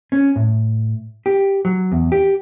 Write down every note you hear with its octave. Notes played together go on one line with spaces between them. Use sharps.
C#4
A2
G4
F#3
E2
G4